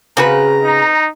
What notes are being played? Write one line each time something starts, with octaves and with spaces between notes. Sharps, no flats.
C#3 C4 F#4 B4 A#5
D#4